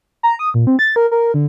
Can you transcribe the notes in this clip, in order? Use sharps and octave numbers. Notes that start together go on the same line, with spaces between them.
A#5
D#6
A#2
C4
A6
A#4
A#4
D3